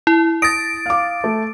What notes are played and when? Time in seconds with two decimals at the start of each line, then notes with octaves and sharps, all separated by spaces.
0.07 E4
0.42 D#6 A6 A#6 D7
0.86 F5 D6
1.24 A3